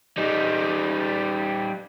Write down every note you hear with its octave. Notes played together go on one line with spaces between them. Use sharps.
G3 D#4